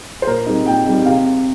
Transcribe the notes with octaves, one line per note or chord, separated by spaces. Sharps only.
C5
A#2 A#4
G3 C4 D#4
A#2 G5
G3 C4 D#4
C3 F5